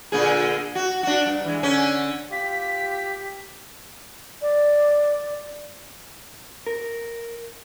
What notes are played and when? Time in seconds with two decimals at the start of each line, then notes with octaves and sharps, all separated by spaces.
0.12 A#2 D3 G#4
0.75 F#4
1.03 D4 F#4
1.26 G2
1.44 E3 G#3
1.63 D3 C#4
2.31 F4 G4 B6
4.42 D5
6.67 A#4